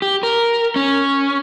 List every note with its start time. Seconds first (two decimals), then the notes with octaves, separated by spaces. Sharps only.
0.02 G4
0.23 A#4
0.76 C#4